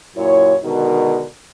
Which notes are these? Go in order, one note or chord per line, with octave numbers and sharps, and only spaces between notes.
F#2 A#2 E4 C#5
B2 D3 D#3 G#3 F#4 A#4